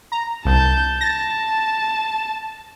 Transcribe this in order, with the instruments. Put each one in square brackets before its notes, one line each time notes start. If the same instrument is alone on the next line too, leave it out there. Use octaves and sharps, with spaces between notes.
[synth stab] A#5
[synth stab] C2 [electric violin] A5 G6
[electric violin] A5 [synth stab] A6 A#6